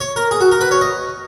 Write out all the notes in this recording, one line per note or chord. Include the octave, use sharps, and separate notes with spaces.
C#5
A#4
G#4
F#4
A#4
B4
C#5
D#5